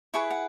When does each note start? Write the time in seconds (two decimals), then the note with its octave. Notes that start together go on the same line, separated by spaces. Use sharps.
0.14 E4 G#4 B4 C#6
0.30 F#5